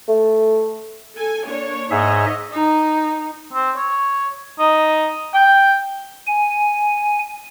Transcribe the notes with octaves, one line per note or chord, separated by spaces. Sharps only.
A3
A4 G#5
A#3 D4 C#5
G#2 G#4 C#5 D#5 E5
D#4
C4
C#5
D#4
G5
G#5